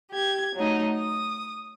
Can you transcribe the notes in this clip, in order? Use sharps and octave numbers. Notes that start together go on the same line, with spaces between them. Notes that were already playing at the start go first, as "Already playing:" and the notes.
G4 G#6
F#3 A3 D#4
D#6